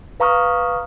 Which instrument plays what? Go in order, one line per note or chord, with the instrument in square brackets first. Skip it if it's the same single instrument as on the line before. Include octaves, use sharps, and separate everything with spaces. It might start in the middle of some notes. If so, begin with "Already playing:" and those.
[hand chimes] B4 F5 A#5 C#6 D#6 F6